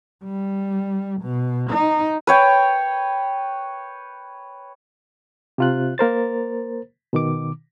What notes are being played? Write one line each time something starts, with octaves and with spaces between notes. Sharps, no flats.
G3
B2
D#4
B4 C#5 G5
C3 F4 F#6
A#3 A#4 C5 A6
B2 D#3 D6